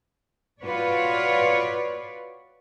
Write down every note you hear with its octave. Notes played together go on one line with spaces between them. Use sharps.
F4 F#4 B4 C#5 D5